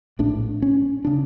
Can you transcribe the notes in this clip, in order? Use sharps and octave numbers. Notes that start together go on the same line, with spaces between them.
A#1 A2 D4
C#4
C#3 D4